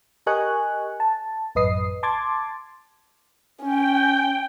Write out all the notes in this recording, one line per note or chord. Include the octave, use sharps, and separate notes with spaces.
G4 A#4 D#5 G#5 C#6 F#6
A5
A1 F#2 B4 D#5 D#6 C7
A5 C6 D6 G#6 A6
C#4 G5